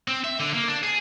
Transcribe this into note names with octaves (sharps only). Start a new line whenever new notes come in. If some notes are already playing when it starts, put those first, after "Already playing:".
C4
E5
D3
A#3
D4
G#4